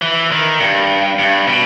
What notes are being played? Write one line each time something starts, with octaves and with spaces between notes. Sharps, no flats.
E3
D#3
G2
G2
B2